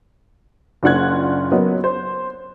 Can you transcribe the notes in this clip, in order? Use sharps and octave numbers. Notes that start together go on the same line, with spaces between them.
F#1 D4 F4 F#5 F#6 G#6
F#3 A#3 B3 D#5
C5